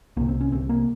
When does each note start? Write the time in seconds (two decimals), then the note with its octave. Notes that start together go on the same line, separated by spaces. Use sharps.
0.17 C2 C3 A#3
0.29 C4
0.41 C#4
0.52 C2 C3 C4
0.69 A#3